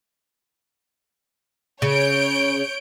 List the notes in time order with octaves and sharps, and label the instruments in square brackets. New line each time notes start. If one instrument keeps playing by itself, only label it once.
[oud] C#3 [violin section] C#5 G6 D7